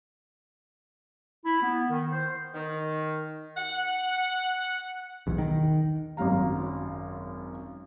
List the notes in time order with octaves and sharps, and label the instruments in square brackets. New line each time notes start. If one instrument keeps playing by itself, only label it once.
[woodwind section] E4
B3
D#3
C5
[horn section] D#3
F#5
[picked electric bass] B1 E2
D#3
[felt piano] G#1 F#2 F#3 F5 A#5